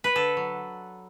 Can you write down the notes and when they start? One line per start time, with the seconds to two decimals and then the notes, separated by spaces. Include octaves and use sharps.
0.04 B4
0.15 D3 A4
0.37 F#3